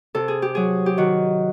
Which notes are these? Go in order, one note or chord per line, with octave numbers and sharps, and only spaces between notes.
C3 A4
G#4
G4
F#3 G#4
G4
D#3 F#4